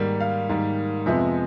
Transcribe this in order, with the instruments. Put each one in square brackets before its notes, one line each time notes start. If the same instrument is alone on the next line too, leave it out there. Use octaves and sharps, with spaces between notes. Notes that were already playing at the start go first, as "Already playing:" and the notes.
Already playing: [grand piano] G#2 D#3 G3 A#3
F5
G#2 D#3 G3 A#3
F2 C3 F3 G#3 B3 E5